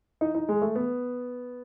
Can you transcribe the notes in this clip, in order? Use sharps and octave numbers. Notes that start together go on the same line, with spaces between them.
D#4
D#4
G#3
A3
B3